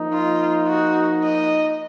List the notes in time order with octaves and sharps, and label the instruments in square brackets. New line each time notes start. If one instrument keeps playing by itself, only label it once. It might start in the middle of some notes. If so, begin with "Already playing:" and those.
Already playing: [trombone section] F3 A#3 D#4
[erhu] F4
F#4
D#5